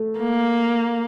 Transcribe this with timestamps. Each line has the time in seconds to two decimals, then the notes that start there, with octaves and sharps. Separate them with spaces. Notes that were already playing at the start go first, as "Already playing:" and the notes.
Already playing: A3
0.20 A#3